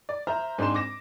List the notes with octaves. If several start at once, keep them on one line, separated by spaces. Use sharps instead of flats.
D5
C5 E5 A#5 F6
G#2 C4 D4 G#4 C6 E7
D6 A#6 E7